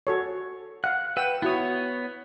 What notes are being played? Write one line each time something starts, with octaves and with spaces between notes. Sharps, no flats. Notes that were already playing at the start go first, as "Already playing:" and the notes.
F#4 A4 C#5
F5 F#5 F#6
B4 F#5 G5 E6
B3 E4 F#4 C#5 D#6